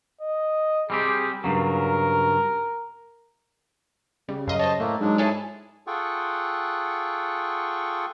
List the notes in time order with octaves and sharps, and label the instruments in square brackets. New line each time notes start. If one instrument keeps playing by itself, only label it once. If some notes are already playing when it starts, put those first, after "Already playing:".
[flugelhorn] D#5
[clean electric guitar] G3 C4 G4 [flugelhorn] G#4
[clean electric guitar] G2 C#3 F#3 [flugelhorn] A#4
[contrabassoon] C#3 [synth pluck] G3
[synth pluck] F#2 D#5 [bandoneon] F5
[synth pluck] C5 C#5 [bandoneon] D#5 A5
[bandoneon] A2 A3 A#3
[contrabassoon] G#2 [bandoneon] F#3 G#3 D4
[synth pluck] E4 A4 C#5 [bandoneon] G#4 G#5 A5
[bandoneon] F4 G#4 A4 F#5 G5 C#6